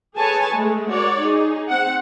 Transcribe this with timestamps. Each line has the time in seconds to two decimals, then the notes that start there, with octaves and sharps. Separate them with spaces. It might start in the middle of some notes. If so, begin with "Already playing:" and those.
0.16 G#4 A4 B4 C#5 G#5 A5
0.52 G#3 A3
0.89 F#4 A#4 C#5 D5
1.20 D#4 G#4
1.70 C4 F#5